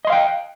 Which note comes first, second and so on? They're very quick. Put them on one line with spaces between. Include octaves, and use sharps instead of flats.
D#5 C6 F5 G5